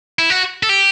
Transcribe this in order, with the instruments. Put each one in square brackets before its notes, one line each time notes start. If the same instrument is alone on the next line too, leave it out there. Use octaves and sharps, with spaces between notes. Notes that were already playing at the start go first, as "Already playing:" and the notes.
[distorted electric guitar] E4
F#4
A4
G4